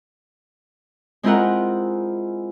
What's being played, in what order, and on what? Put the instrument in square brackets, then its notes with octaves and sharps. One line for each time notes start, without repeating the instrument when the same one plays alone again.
[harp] G#3 C4 E4 F4 A#4 F#5